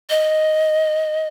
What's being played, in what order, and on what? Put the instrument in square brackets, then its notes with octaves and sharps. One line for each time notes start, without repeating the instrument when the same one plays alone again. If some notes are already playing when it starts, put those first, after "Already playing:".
[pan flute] D#5